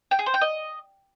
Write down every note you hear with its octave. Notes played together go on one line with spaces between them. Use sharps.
G5
G#4
C5
G5
D#5